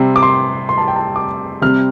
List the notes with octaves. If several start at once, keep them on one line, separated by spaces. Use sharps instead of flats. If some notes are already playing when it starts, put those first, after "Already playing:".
Already playing: C3 G3 C4
D6
C6
C6
A5
G5
A5
D6
C3 G3 C4 F6